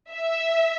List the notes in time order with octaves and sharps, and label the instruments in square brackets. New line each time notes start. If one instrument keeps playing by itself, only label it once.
[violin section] E5